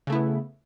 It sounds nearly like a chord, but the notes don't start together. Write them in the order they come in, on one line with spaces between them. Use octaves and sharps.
C#3 A3 E4 B3